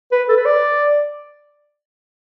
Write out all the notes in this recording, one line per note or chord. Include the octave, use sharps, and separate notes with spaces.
B4
A4
B4
D5